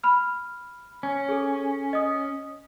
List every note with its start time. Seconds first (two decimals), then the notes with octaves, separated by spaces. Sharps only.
0.04 B5 F6
1.03 C#4
1.29 G#4 A4
1.93 D#5 D#6